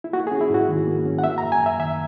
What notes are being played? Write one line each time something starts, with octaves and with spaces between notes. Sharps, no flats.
E4
A#3 F#4
G#4
C#4
E4
G#2 F#4
D#3
A#3
C#4
F#5
A#3 E5
A#5
F#2
G#5
F#2 E5
D#3 E5